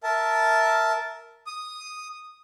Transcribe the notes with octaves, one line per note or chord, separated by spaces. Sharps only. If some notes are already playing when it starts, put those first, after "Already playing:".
A#4 E5 A5
D#6